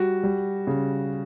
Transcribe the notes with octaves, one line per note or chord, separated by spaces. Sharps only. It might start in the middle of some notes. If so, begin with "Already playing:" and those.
Already playing: G3 F#4
G3
C#3